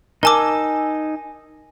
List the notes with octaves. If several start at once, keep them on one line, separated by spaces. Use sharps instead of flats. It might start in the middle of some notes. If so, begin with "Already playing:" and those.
D#4 A#4 G#5 A5 D6 E6